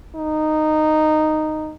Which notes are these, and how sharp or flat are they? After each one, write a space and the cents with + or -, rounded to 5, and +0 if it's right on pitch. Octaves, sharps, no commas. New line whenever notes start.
D#4 -10